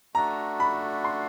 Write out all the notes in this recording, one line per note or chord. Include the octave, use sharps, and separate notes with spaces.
A3 D4 F#4 A#5
B5
C6